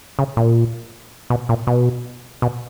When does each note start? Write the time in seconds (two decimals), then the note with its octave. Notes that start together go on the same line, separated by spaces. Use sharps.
0.19 C#3
0.37 A#2
1.30 B2
1.49 A#2
1.67 B2
2.42 B2